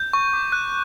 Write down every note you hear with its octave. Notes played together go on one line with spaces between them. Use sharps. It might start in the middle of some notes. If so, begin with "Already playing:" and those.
Already playing: G6
C#6
D6
F#6